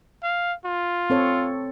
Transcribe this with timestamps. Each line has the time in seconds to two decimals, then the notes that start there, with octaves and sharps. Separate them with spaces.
0.23 F5
0.65 F4
1.10 C4 A4 C#5